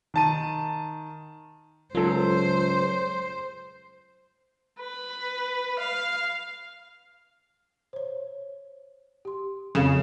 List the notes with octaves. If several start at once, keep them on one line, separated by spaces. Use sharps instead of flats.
D#3 A5 D#7
C#2 F#3 F4 A4 C5
B4
F5
C5 C#5
G4 C6
F2 C#3 A4 F5 B5 E7